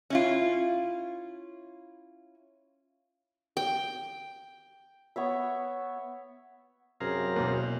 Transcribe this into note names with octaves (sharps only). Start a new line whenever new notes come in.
C#4 E4 F4
G5
B3 C#5 E5
F#2 C3 G#4 F5 A#5
E2 B2 A#3